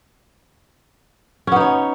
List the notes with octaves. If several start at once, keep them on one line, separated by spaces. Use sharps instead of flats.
B3 C#4 D#4 C#5